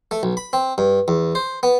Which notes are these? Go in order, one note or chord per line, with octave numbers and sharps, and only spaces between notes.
A3
B1
B5
C4
G2
E2
C5
B3